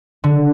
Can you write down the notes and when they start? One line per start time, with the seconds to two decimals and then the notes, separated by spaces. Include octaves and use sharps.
0.24 D3